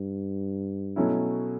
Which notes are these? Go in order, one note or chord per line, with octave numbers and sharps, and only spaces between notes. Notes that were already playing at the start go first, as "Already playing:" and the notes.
Already playing: G2
B2 F#3 A3 C#4 E4